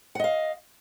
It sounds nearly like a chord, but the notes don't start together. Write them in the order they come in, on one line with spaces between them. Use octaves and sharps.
F#5 D#5 F5